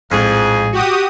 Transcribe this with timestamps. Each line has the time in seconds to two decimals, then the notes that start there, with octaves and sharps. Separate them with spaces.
0.11 A#1 F2 A2 G#3 G#4
0.72 F#4 G4 D#6